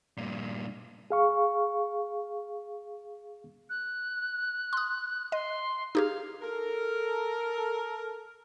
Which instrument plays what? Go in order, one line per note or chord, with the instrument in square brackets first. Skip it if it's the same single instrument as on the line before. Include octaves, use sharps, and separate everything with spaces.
[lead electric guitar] G2 A#2
[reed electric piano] G#4 F5 C#6
[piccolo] F#6
[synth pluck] C6 D#6
[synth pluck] D#5 [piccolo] C6
[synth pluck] D#4 G4 G#4 [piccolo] F5
[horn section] A4 A#4